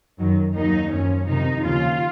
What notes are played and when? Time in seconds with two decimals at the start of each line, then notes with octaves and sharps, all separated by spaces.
0.19 F#2 D#3 F#3
0.55 D#2 D#3 F#3 D#4
0.91 F#2 F3 C#4
1.27 F2 C3 D#3 D#4
1.62 D#2 C#3 F3 F4